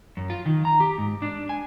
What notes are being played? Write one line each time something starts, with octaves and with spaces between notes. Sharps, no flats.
F#2
F4
D#3
A#5
G4
G#2
D4
G#5